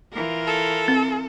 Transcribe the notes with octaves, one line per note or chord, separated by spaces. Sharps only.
E3 F4 A#4
A4
C4